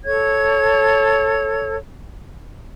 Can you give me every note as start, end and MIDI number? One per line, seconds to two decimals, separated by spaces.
0.04 1.75 69
0.04 1.75 73
0.04 1.75 92